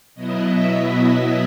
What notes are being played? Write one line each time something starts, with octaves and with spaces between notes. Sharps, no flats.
B2 F#3 B3 E4 D#5
E5